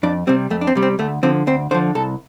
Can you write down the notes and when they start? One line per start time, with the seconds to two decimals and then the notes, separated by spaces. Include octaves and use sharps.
0.03 F2 D4
0.27 C3 G3 C4
0.50 F2 A3
0.61 D4
0.67 C4
0.75 C3 G3
0.82 C4
0.99 D2 A3
1.23 D3 F3 C4
1.47 D2 C4
1.71 D3 C5
1.74 F3
1.95 C2 A4